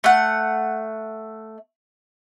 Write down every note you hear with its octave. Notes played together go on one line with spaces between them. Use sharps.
A3 F#5